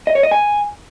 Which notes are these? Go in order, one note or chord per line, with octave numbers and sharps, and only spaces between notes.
D#5
C#5
D#5
G#5